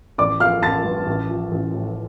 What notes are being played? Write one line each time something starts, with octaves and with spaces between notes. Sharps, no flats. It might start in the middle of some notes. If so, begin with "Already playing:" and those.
A1 D5 D6
F3 F5 F6
A1 A5 A6
G2
A1
F3
A1
A2